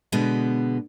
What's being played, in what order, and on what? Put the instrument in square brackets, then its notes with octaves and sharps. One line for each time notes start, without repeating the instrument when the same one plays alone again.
[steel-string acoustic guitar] B2 D3 G#3 B3